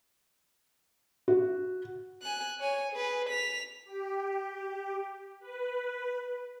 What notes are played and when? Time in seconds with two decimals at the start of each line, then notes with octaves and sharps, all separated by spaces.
1.28 F#4
2.22 G#5 F#6
2.60 C#5 G#5
2.92 G#4 B4
3.29 B6 F7
3.85 G4
5.40 B4